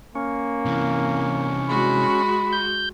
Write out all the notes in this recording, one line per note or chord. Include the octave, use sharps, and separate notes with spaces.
A#3 C#4
C3 E3
G#3 F#4 B5
G6